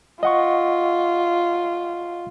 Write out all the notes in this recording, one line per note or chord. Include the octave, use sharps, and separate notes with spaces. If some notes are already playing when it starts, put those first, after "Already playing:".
F4 D#5 F#5 C#6